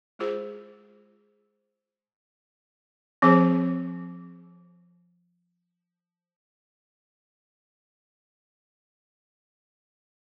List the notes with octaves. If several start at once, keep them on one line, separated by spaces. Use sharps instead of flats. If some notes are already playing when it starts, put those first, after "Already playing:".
G#3 F4 G#4 C5
F3 C4 G#4 C5